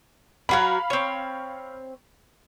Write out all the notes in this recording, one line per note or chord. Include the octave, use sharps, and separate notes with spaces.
F#3 F#4 A#4 F5 B5
C4 C#5